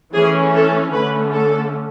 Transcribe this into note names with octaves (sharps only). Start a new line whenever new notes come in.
E3 A3 C#4 G#4
A4
D3 A3 C#4 B4
A4